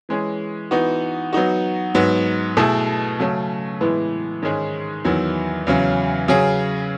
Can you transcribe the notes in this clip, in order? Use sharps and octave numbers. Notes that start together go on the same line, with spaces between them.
E3 G#3 C#4 G#4
E3 B3 D#4 F#4
F#3 B3 D#4 F#4
G#2 F#3 B3
B2 A3 E4 G#4
C#3 F#3 A3 C#4
A2 E3 G#3 B3
G#2 D#3 G#3 C#4 G#4
E2 D#3 F#3 B3 E4
E2 C#3 F#3 C#4
C#3 F#3 C#4 G#4